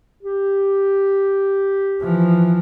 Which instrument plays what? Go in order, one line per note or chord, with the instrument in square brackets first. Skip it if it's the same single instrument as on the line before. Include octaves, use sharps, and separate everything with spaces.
[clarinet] G4
[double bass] E3 F3